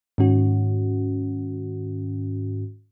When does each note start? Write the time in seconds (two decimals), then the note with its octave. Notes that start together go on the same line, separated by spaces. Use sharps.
0.18 G#2 D#3 C#4 F#4